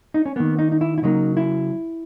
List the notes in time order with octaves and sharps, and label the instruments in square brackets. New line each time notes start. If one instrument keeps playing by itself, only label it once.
[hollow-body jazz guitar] D#4
C#4
D#3 A#3 B3
D#4
D#4
E4
E4
C#3 F#3 A#3 D#4
E4